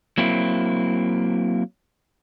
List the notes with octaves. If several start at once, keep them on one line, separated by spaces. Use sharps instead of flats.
F#3 A#3 C4 E4